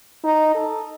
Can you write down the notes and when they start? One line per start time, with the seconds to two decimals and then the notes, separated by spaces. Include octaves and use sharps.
0.24 D#4
0.55 A4